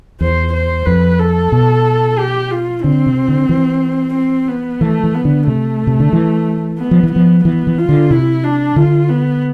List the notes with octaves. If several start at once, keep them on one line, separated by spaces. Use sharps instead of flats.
E2 C5
C5
F2 B4
A4
B2
G4
F4
D3 C4
C3
D3
E3
C4
B3
E3 A3
E3
B3
D3
C3 A3
C3
D3
E3
B3
F3
E3
F3 B3
E3 B3
E3
F4
D3
C3 E4
D4
D3 F4
B3